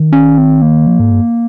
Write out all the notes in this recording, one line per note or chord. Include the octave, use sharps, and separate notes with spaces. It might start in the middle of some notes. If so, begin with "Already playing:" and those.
Already playing: D#3
C#4
C4
A#3
F3
G#2
G2